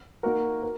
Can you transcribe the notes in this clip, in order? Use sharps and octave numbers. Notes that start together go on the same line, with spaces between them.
A#3 D#4 F#4 A#4
A#4